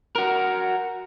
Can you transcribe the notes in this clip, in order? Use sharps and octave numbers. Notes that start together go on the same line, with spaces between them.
F#4 A#4